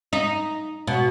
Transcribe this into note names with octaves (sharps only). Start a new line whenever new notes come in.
D#4
B2